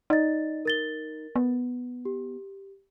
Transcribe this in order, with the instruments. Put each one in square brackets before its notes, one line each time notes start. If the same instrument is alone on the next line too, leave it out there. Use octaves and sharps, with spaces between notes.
[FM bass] D#4 [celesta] D5 D#5 A6
[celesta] A#4 A6 G7
[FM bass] B3
[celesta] G4